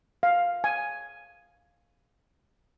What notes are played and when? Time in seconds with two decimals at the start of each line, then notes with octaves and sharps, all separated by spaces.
0.23 F5
0.64 G#5